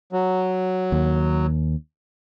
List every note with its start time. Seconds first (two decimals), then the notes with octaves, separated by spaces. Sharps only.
0.13 F#3
0.92 D#2